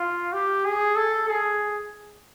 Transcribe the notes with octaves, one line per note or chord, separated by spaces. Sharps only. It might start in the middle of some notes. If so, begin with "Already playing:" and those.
Already playing: F4
G4
G#4
A4
G#4